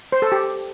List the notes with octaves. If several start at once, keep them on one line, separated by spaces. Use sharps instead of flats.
C5
A4
G4